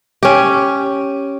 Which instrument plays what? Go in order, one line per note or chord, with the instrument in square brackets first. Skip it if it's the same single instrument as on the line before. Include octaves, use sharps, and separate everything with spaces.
[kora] C#4 G4